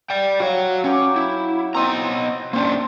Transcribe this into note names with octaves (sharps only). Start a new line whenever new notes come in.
D5 G5
F#4 C#5 F5
F#3 C#4 G5 D6
E4
B3 C4 D#5 A#5
A#3 C#4 D4 C5 G5